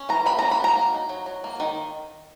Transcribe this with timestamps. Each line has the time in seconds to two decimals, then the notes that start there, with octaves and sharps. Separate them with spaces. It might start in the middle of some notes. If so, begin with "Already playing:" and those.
Already playing: C#4
0.09 E3 A#5
0.26 A#3 B5
0.39 C#4 A#5
0.51 B5
0.60 F#3 A#5
0.76 A#3
0.94 D#4
1.09 F#3
1.26 F#3
1.44 A#3
1.60 D#3